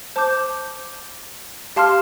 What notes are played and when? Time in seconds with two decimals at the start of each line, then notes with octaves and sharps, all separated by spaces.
0.16 C5 A5 D6 G6
1.76 G4 F5 A5 C6 F6